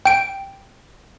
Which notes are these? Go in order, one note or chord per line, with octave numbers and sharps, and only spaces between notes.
G5 D7